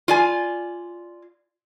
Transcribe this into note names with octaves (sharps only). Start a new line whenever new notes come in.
F4 D5 G#5